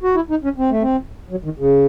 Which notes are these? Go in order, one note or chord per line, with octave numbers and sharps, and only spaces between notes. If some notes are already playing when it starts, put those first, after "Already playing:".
F#4
E4
D#4
C#4
C4
A3
C4
F#3
D#3
C#3